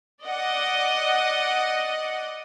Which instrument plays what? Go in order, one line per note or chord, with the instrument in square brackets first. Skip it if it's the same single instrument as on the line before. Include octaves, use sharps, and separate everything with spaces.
[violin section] D5 D#5 F#5